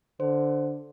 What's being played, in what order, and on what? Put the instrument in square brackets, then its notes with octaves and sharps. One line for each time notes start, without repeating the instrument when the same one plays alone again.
[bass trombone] D3 [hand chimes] C5